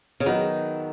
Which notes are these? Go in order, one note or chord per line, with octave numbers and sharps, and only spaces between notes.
C#3
D#3 F#3 B3 F#4